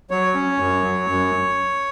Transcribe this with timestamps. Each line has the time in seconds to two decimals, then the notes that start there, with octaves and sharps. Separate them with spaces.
0.11 F#3 C#5
0.34 C#4
0.58 F#2
0.82 F#3
1.07 F#2